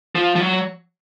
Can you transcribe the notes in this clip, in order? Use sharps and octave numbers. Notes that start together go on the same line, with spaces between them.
F3
F3
F#3